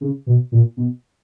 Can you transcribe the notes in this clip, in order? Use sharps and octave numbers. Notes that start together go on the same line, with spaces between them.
C#3
B2
A#2
B2